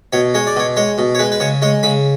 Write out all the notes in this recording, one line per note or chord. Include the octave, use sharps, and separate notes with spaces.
B2 C#5
G#3 C#5
D5
B2 C#5
G#3 C#5
B2
C#5
G#3 B4
B4
C#3 C#5
G#3 C#5
C#3 B5